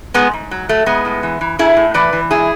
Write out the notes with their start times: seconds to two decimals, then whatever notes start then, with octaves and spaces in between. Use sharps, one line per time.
0.14 G#2 G#3 B3
0.33 G#2
0.51 F#3
0.69 F#3 A3
0.86 A2 G#3 B3
1.05 A2
1.23 E3
1.41 E3
1.59 A2 E4 G#4
1.77 A2
1.94 E3 B4 D5
2.13 E3
2.31 G#2 E4 G#4